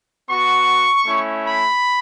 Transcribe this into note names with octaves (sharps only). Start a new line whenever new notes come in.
B3 F#4 C#6
A3 C#4 E4
B5